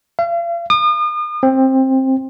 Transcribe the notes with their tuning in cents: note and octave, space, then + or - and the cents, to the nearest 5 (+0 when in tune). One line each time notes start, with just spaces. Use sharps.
F5 -40
D#6 -40
C4 +15